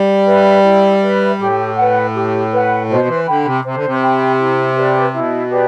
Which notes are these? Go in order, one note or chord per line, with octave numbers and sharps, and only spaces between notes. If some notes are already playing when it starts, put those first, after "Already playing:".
Already playing: G3
B4 E5
E4
B4 E5
A2 G4
B4 F#5
G4
B4 F#5
B2 C5
E3
D3 G5 B5
C3
C3 C5
D3
C3
G5 B5
E4
G4 B4 D5
B2 E4
G4 B4 D5